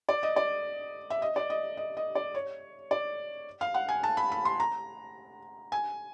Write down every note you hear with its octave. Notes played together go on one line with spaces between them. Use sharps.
D5
D#5
D5
E5
D#5
D5
D#5
D#5
D#5
D5
C#5
D5
F5
F#5
G#5
A5
B5
B5
C6
A#5
G#5